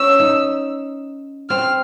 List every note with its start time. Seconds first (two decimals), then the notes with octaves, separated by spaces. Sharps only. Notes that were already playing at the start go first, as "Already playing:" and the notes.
Already playing: C#4 E6
0.20 D#4
1.50 C4 F6